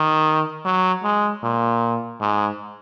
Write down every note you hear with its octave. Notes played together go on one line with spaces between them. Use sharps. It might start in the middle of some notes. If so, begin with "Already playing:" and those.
Already playing: D#3
F#3
G#3
A#2
G#2